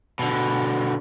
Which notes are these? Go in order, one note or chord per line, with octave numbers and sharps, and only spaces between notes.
B2 D3